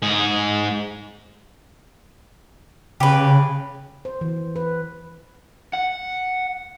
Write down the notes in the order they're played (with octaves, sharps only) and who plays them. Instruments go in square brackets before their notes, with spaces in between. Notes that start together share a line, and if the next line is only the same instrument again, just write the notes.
[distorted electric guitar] G#2 G#4
[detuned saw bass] C#3 [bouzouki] G4 B4
[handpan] C5
E3
B4
[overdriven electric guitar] F#5